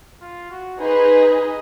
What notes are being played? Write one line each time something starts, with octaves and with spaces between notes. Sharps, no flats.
F4
F#4
D#4 G#4 B4 C5
D#5